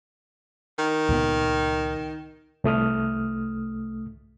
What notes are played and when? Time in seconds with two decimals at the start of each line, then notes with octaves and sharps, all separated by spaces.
0.79 D#3
1.09 C#2 A#2 B3
2.64 C2 A3 D#6 F6